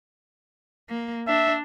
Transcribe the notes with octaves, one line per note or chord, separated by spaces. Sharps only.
A#3
D4 E5